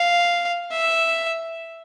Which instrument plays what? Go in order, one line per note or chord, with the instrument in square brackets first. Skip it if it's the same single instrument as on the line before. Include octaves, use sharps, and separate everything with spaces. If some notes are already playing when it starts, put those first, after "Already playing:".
Already playing: [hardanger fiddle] F5
E5